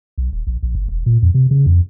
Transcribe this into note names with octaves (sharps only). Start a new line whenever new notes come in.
B1
D#1
A#1
A#1
G1
E1
A#2
F2
C3
C#3
F2